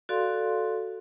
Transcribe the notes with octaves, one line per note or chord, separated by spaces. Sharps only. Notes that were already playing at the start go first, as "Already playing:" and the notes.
F#4 A4 D5 F5 C6